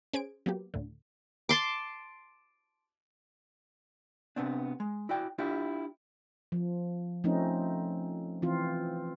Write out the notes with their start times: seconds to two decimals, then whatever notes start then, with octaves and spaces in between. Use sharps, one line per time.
0.13 C#4 G#4 C5 G#6 D7
0.46 F#3 A#3 B3 G4
0.74 D2 A2 D3
1.49 A5 C6 D6
4.36 C3 B3 C4 D4
4.80 G#3
5.09 E4 F#4 D5 G5
5.38 D4 E4 F4 G4
6.52 F3
7.24 F3 A3 C4 C#4 D#4
8.42 E3 C4 F4